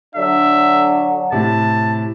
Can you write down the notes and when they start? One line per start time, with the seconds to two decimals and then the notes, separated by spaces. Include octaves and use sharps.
0.15 D3 F#3 D4 E5
1.32 A2 C3 A5